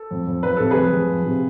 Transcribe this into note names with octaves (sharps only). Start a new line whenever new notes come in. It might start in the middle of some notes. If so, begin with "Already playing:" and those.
Already playing: A4
F2
F2
F3 B4
C3 A4
G#4 B4
F2
F2
F3
C3